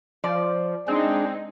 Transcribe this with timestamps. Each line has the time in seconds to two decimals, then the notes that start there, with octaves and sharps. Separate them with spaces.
0.24 F3 D5
0.88 G#3 C4 D4 D#4 G#4